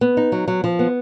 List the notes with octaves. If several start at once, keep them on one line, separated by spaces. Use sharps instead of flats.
B3
D#4
F#3
F#3
F3
B3